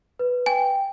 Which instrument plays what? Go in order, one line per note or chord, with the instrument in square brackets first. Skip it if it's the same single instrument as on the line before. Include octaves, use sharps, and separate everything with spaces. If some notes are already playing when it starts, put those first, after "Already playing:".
[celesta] B4
[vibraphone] G5 [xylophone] G#5